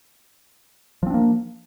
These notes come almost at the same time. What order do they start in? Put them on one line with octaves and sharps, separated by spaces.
F3 C4 D4 A#3